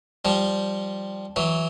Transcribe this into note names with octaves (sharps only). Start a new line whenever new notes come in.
F3 G3
E3 F#3